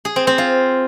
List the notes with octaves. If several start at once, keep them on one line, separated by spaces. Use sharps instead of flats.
G#4
C4
C4
F4